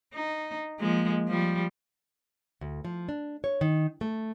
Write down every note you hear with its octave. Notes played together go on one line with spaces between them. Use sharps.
D#4
F3 G#3 A#3
F3 G3
D2
F3
D4
C#5
D#3
A3